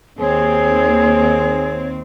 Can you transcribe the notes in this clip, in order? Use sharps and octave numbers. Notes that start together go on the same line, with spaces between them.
D#2 C4 G#4 C#5